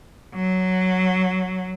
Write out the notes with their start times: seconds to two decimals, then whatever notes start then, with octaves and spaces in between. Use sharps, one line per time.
0.34 F#3